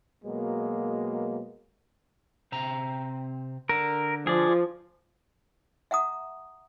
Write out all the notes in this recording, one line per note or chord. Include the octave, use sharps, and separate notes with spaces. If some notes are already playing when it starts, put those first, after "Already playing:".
B2 F#3 G#3 A#3
C3 C4 A#5
D3 A#4
F3 G#4 D5
E5 F#5 A#5 D#6